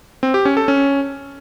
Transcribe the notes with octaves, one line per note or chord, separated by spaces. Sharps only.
C4
G4
C#4
A4
C#4